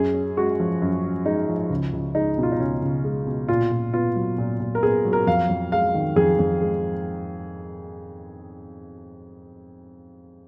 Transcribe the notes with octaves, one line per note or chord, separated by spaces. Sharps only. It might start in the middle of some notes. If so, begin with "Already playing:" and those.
Already playing: F#2 G#4
C#4
G#3 F#4
F3
F#2
C#4
G#3 D#4
F3
C#2
C#2
G#3 D#4
B2
F4
D#4
C#2 C#4
C#2
G#3
B2
A#2 F4
A#2
B3 F4
F#3
A#2
A#2
A#4
B3 G#4
F#3
A#4
F2 F5
F2
G#3 F5
D#3
F2 G#4
F2
G#3